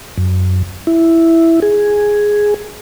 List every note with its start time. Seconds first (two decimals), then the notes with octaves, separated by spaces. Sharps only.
0.18 F#2
0.87 E4
1.62 G#4